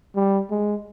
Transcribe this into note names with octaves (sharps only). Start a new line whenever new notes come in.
G3
G#3